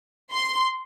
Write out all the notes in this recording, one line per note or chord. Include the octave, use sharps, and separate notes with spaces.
C6